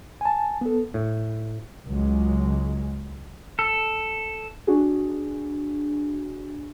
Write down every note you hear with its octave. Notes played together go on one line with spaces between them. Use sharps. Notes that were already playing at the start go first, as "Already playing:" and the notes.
G#5 A5
B3 A4
A2
C#2 F#3 G#3
A4
D4 F#4 G#4